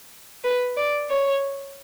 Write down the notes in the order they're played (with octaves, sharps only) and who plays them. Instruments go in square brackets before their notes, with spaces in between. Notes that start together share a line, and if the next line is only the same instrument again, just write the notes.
[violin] B4
D5
C#5